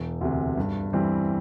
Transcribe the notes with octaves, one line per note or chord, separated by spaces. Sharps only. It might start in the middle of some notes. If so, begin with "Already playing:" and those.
Already playing: E1
D2 C3
G2
E3 G3 C4